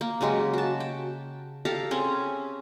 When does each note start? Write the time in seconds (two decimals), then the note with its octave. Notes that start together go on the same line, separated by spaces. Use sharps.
0.01 A#3
0.21 C#3 F#3 G#3 G4
0.53 F#4 A5
0.80 G5
1.65 G4 A4 F5 A#5
1.91 C4 C#4 G#4